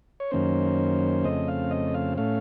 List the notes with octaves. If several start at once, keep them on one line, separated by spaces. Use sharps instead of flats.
C#5
F#2 D#3 A#3 C#4 C5
F2 C#3 A3 C4 D#5
F5
D#5
F5
A2 A3 C#4 F5